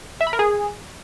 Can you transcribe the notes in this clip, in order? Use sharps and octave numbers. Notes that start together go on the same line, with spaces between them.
E5
B5
A#4
G#4